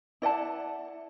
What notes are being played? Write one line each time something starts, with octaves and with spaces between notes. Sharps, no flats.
E4 D5 F#5 A5